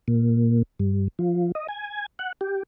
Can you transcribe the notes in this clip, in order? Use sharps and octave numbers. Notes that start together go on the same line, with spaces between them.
A#2
G2
F3
D#5
G#5
F#5
G4